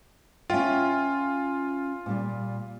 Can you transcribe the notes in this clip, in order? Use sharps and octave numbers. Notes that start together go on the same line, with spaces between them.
C#4 F4 E5 G5
A#2 G3